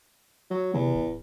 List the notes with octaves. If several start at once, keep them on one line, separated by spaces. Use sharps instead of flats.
F#3
E2 C3
D1